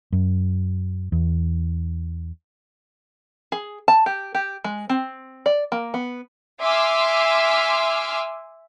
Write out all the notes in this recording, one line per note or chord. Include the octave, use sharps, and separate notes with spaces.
F#2
E2
G#4
A5
G4
G4
G#3
C4
D5
A#3
B3
E5 G#5 C6 D6 E6 F6